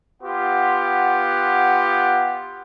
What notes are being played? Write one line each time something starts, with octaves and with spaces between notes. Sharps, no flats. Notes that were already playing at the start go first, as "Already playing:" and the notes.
B3 F4 G4 F#5